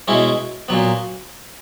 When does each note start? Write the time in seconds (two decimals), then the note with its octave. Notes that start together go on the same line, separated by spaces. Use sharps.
0.08 B2 G#3 C#4 E4
0.68 A#2 F#3 B3